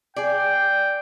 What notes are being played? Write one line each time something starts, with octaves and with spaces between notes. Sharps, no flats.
G#4 D5 G5